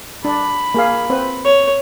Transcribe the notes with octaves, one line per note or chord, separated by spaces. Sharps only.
D4 B5
A#3 G#4 F5
C4 B4
C#5